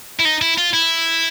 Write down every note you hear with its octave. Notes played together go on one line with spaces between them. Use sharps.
E4
D#4
E4
F4
E4